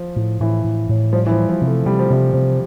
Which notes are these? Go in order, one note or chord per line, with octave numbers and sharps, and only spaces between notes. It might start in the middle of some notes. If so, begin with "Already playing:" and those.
Already playing: F3
A2
A2 E3
A2
A2
F3 G3
E3
F3
G3
F3
C3
A3
C3 G3
F3
C3 G3
C3